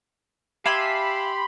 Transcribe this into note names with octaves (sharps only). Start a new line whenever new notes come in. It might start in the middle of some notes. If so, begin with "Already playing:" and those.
G4 E5 F5 G#5 A5 B5 C6 D6